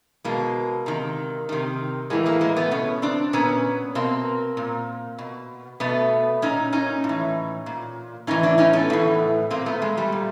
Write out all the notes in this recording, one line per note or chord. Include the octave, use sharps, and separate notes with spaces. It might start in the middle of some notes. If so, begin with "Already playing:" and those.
B2 G#3 A#3
C3 D#3
C3 D#3
A2 E3 G#3 A#3
G#3 A#3
G#3 A#3
A3 B3
B2 B3 C#4
C4 D4
A#2 B3 C#4
B2 A#3 C4
A#2
B2
B2 A3 B3
A#2 C#4 D#4
C#4 D#4
A2
E3
A#2
A2 E3 C#4 D#4
D4 E4
C#4 D#4
A3 B3
A2 E3
A#2 A#3 C4
A3 B3
G#3
G3 A3
A#2